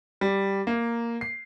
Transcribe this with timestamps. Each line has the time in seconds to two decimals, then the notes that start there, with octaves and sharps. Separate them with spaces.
0.21 G3
0.67 A#3
1.21 C7